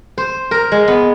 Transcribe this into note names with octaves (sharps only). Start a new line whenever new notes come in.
C5
A#4
G#3
B3